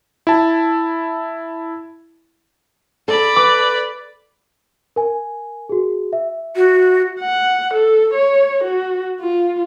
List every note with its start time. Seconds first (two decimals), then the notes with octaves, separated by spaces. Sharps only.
0.27 E4 A5
3.08 A4 D5 B5
3.36 B4 D6
4.96 A#4 G#5
5.69 F#4 G#4
6.13 E5
6.56 F#4
7.20 F#5
7.74 A4
8.14 C#5
8.64 F#4
9.20 F4